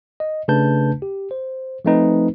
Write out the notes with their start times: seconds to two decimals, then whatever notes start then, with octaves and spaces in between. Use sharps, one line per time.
0.20 D#5
0.48 C#3 A3 D4 B4 A5 G6
1.02 G4
1.31 C5
1.85 F3 A3 C4 D#4 B4